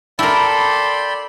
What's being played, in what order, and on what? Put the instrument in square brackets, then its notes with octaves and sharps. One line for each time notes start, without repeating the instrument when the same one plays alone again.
[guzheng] E4 A#4 [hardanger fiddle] A4 C6 [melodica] D5 G5 B5